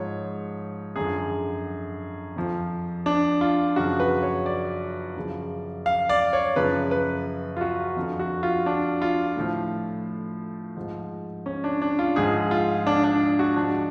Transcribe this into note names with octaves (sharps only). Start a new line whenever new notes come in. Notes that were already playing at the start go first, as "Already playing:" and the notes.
Already playing: G#2 F3 C#5
F#2 D3 F3 G#4
F2 F3
D4
F4
F#2 C#3 F3 F#4
B4
C#5
D5
F#2 C#3 F3
F5
D5
C#5
F#2 C#3 F3 B4
B4
F4
F#4
F2 D3 F3
F#4
F4
D4
F4
A2 F3
G#2 F3
C#4
D4
D4
F4
G#2 F3 G#4
F4
D4
D4
F#4
G#2 F3 D4